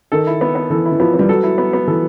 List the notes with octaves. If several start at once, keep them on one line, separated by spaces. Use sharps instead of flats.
D#3 A4
E4
B3
B3
E3 A4
E4
E3
F3 B3
G3 B3
F#3 A4
E4
B3
B3
E3 A4